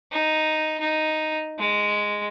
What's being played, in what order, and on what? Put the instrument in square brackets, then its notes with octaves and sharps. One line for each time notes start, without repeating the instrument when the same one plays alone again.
[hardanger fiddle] D#4
D#4
G#3